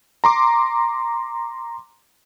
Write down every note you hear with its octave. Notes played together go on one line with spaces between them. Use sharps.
A#5 C6 D6